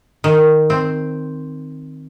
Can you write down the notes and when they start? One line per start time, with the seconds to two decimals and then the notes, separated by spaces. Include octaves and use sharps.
0.24 D#3
0.70 C4